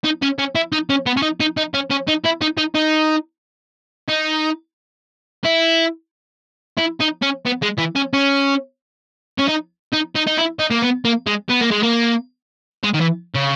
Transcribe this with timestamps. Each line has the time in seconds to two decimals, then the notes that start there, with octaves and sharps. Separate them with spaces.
0.04 D#4
0.22 C#4
0.39 C#4
0.55 E4
0.72 D#4
0.90 C#4
1.06 B3
1.17 C#4
1.22 D#4
1.40 D#4
1.57 D#4
1.74 C#4
1.90 C#4
2.08 D#4
2.24 E4
2.41 D#4
2.58 D#4
2.75 D#4
4.09 D#4
5.44 E4
6.78 E4
7.01 D#4
7.22 C#4
7.46 B3
7.63 G#3
7.79 E3
7.96 C#4
8.13 C#4
9.38 C#4
9.48 D#4
9.93 D#4
10.15 D#4
10.27 D#4
10.37 E4
10.59 D#4
10.71 A#3
10.82 B3
11.05 A#3
11.26 G#3
11.49 B3
11.61 A#3
11.71 G#3
11.83 A#3
12.83 G#3
12.94 D#3
13.00 E3
13.34 C#3